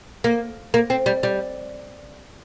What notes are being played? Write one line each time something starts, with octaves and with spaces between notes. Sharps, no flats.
A#3
A#3
C4
G3
G3